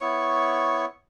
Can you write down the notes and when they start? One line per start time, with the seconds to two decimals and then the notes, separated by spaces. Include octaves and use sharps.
0.01 B3 E4 C#5 C#6